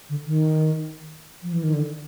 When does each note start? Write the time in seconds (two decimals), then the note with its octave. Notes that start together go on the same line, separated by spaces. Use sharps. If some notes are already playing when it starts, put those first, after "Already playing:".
0.09 D3
0.26 D#3
1.43 F3
1.53 E3
1.63 D#3
1.73 D3